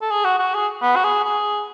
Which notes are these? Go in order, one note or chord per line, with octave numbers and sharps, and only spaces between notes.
A4
G#4
F#4
F#4
G#4
B3
F#4
G#4
G#4